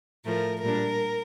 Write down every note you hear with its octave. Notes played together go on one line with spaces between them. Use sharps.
A2 F3 A3 A#4
A#2 G3 D4 A#4